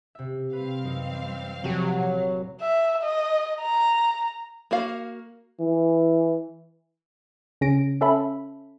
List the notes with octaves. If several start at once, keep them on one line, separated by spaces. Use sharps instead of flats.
C3 E5
G3 C4 B4 F5
F#2 E3 D#4
F1 C3 F3 F#3 G4 C7
A#2
E5
D#5
A#5
A#3 F#4 F5
E3
C#3 C#4 A#6 D7
C#4 A4 E5 B5